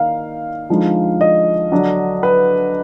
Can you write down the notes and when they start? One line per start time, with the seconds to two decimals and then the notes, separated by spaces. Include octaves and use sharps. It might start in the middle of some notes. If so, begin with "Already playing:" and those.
Already playing: D#3 A#3 D#4 F5
0.69 D3 F3 G#3 D#4
1.21 D#5
1.71 D3 F#3 D4
2.23 B4